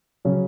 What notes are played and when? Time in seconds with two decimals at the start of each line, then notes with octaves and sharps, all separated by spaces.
0.25 C#3 F#3 C#4